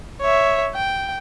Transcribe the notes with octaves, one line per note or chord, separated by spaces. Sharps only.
C#5 E5
G5